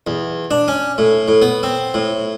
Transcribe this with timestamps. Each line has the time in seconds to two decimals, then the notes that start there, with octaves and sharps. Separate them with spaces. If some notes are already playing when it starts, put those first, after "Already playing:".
0.07 E2
0.51 D4
0.68 C#4
0.98 A2
1.28 A2
1.42 B3
1.63 C4
1.94 A2